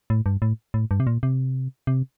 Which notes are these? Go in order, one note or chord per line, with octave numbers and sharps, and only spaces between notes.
A2
G2
A2
A2
G2
C3
A#2
C3
C3